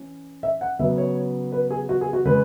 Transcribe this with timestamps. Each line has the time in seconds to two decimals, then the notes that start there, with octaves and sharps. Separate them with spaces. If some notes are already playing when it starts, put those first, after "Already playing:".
Already playing: E3 C#4
0.43 E5
0.61 F#5
0.79 C#3 F#3 B3 E5
0.98 C#5
1.52 B4
1.71 G#4
1.89 F#4
2.01 G#4
2.13 F#4
2.25 C#3 G#3 B4